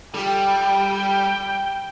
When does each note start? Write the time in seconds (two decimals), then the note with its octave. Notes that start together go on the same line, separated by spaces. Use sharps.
0.14 G3 F4 G4 A4 G5